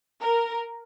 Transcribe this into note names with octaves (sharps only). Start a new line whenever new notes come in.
A#4